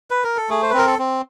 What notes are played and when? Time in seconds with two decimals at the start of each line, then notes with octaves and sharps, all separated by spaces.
0.11 B4
0.24 A#4
0.37 A4
0.49 A3 G#4
0.62 C5
0.70 B4
0.74 C4 A#4
0.87 A4
0.99 C4